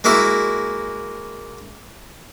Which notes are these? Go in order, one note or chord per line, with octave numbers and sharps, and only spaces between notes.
G#3 A#3 E4 F#4